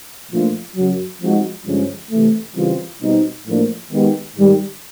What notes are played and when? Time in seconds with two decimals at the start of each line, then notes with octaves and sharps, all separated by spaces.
0.31 A#2 F3 A3 D4 F4
0.76 F#2 C#3 F#3
1.21 F3 G#3 C4 D#4 F#4
1.66 G2 D3 F3 G#3 C#4
2.11 C3 E3 A3
2.56 C#3 E3 G3 C4 F4
3.01 B2 G3 C4 D#4
3.46 A2 F3 A#3 D4
3.91 D#3 G#3 B3 D#4 G4
4.36 G#2 D#3 G3